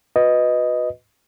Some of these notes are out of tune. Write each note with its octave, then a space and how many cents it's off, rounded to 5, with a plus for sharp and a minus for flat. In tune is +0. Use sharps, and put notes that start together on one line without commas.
F#4 -25 B4 +0 D#5 +0